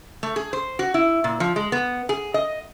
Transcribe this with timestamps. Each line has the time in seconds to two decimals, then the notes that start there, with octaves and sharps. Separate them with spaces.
0.23 A3
0.36 G#4
0.53 C5
0.79 F#4
0.94 E4
1.24 A#2
1.40 F3
1.56 G#3
1.72 B3
2.09 G#4
2.34 D#5